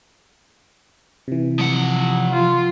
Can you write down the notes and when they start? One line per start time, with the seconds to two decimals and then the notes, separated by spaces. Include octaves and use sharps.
1.28 C3 E3
1.60 F3 F#5
2.32 F4